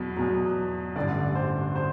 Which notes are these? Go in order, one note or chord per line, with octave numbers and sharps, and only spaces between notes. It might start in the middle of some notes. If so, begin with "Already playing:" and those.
Already playing: E2 B2 F#3
E2 B2 F#3
A1 G2 D3 D5
C5
C5